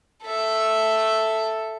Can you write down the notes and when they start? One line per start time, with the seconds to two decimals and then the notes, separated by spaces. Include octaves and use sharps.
0.24 A4 E5